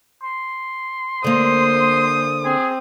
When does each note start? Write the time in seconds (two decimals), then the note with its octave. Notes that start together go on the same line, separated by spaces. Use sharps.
0.23 C6
1.24 D3 A#3 C5 D#6
2.44 C4 G#4